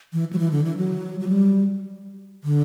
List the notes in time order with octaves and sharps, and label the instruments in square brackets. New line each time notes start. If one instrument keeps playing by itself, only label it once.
[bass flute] E3
F#3
E3
D3
E3
F#3
F#3
G3
D3